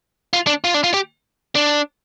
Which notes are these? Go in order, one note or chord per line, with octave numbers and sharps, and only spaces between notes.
F4
D4
F4
D4
F4
G4
D4